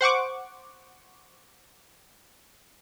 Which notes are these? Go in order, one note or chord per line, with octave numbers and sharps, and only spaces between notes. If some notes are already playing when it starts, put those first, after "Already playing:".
C5 F#5 C#6 D6